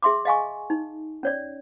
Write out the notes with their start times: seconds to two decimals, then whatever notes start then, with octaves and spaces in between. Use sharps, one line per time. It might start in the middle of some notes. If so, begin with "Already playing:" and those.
0.03 G#4 E5 C6 D6
0.25 D#5 F5 G#5 C#6
0.70 D#4
1.23 C#4 C#5 D5